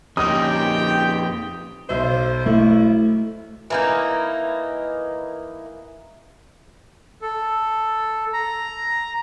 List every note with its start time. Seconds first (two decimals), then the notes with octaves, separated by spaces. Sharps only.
0.17 F2 A#3 C#4 D#4 G4 G5 D#6
1.89 B1 C5 E5
2.46 A3 E4
3.70 E3 A#3 D#4
7.22 A4
8.33 A#5